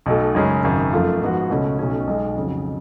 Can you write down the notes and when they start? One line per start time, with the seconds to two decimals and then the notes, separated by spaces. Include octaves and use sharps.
0.06 B1 B2 A3
0.35 F#2 C#3 G#3 C#4
0.63 G#1 F#2 C#3
0.92 F#2 F3 A3 F4
1.21 G#2 F3 B3 F#4
1.50 C#2 B2 A3 C#4
1.79 B1 B2 A3 C#4
2.07 B1 B2 G#3
2.35 F2 C#3 F#3